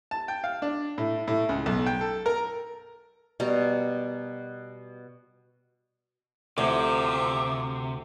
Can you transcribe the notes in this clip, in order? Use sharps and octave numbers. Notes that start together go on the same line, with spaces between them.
A5
G5
F5
D4
A2
A2
C#2
B1
G5
A4
A#4
B2 G3 A#4 A#5
D2 C3 F3 E5 D6